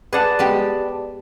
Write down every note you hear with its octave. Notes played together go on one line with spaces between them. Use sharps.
G#4 B4 D5 F#5 A5
G#3 B3 G4